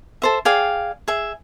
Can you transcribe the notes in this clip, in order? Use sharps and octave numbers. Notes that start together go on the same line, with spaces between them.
A4 C5 E5
G#4 D5 F5 G5
G#4 E5